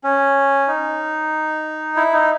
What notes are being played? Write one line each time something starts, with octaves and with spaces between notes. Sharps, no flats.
C#4
D#4
E4
D#4